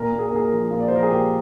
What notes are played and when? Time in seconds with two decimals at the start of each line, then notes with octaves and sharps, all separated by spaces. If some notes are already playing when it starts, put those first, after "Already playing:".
Already playing: A#2 A#4
0.13 A#2
0.19 G#4
0.28 A#4
0.32 A#2 G#4
0.45 A#4
0.52 F3
0.71 A#2 F4
0.80 D5
0.88 C5
0.91 F3 A#4
1.03 G#4
1.10 A#2 G4